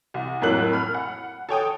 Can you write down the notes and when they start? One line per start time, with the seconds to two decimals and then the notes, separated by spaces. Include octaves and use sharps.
0.14 C2
0.42 F2 A2 F#3 A#3 F#6 F#7
0.73 B5 F6
0.94 F#5
1.49 A4 C#5 G5 D#6